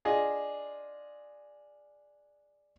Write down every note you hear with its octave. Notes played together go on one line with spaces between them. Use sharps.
D4 F4 G#4 D#5